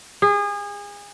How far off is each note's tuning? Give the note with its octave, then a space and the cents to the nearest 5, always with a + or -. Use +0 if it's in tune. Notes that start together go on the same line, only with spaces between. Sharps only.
G#4 -30